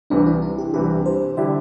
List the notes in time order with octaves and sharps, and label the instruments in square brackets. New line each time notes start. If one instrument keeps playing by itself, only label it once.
[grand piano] C2 C3 E3 [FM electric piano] D4
[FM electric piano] E4
E4
G4
[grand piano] C2 C3 E3 [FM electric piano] G4
[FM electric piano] C5
[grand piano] D3 G3 E4 G4 [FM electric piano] E5